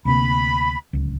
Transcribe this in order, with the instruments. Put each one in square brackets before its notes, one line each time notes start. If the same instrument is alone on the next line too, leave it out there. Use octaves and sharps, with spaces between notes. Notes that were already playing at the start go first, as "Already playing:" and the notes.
[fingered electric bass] D2 C3 A#3 [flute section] B5
[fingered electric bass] D1 C#2